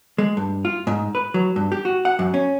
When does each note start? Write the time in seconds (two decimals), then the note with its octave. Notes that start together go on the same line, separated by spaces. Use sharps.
0.18 G#3
0.37 G2
0.65 F4
0.87 G#2
1.15 B4
1.34 F#3
1.56 G2
1.72 G4
1.85 F#4
2.05 F#5
2.19 F#2
2.34 C#4